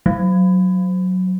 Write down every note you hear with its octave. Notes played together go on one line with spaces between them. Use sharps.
F#3